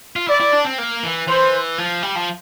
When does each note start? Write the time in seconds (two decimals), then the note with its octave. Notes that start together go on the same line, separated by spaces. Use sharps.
0.16 F4
0.27 E4 D5
0.40 E4
0.53 D4
0.65 C4
0.78 A#3
1.03 E3
1.27 E3 C5
1.78 F3
2.02 G3
2.16 F3